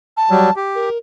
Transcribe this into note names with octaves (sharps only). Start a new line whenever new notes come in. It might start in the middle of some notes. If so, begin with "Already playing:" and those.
A5
F#3 G3
G4
A#4